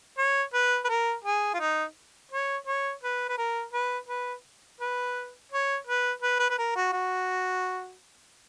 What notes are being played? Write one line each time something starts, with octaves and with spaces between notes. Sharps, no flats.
C#5
B4
B4
A#4
G#4
F4
D#4
C#5
C#5
B4
B4
A#4
B4
B4
B4
C#5
B4
B4
B4
B4
A#4
F#4
F#4